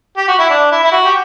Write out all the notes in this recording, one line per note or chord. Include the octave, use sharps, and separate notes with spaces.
G4
F#4
E4
D4
E4
E4
F#4
G4